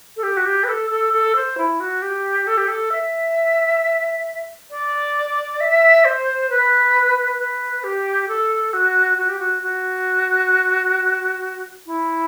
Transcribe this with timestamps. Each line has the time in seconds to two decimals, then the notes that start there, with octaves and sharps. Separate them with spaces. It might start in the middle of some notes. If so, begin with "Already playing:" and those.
0.16 A4
0.23 G4
0.37 F#4
0.45 G4
0.63 B4
0.68 A4
0.90 A4
1.13 A4
1.35 C5
1.57 E4
1.80 F#4
2.02 G4
2.47 A4
2.57 G4
2.68 A4
2.91 E5
4.70 D5
5.60 E5
6.04 C5
6.49 B4
7.39 B4
7.83 G4
8.28 A4
8.73 F#4
9.17 F#4
9.29 G4
9.39 F#4
9.62 F#4
11.86 E4